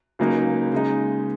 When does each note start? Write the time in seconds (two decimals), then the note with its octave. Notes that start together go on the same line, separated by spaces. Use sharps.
0.19 C#2 C#3 F#3 A#3 D#4
0.72 C#3 G#3 D#4